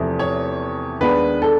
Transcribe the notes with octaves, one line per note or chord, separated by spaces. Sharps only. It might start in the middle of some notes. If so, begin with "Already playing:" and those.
Already playing: E2 C3 F3 A3
C#5
D#2 D#3 G#3 B3 D4 B4
A4